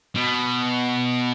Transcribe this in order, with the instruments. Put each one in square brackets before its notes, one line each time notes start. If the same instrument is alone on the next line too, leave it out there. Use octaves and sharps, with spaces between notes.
[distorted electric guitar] B2